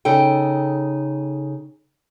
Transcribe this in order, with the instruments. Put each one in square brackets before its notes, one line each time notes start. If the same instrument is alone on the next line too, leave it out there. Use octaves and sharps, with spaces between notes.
[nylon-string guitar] C#3 D#4 A4 G5